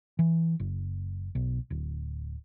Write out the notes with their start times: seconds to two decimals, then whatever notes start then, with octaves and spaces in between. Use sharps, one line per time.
0.19 E3
0.60 F#1
1.35 B1
1.70 D1